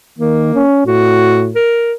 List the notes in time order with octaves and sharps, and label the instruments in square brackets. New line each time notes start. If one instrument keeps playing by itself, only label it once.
[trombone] D#3 [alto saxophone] A#3
[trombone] C#4
[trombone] A2 [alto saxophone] F#4
[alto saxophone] A#4